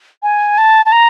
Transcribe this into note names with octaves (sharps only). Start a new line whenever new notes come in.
G#5
A5
A5
A#5